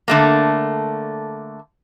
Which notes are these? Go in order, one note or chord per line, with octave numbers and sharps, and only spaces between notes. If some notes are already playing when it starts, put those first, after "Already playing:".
D3 A3 A#3